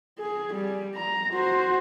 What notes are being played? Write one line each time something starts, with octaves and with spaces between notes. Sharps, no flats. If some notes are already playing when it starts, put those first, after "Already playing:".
G#4
G3
A#5
F#4 C5